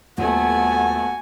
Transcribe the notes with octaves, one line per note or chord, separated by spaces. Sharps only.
D#1 A3 B3 F#4 F#5 G#5